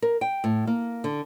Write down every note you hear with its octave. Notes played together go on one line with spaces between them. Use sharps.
A#4
G5
A2
A#3
D3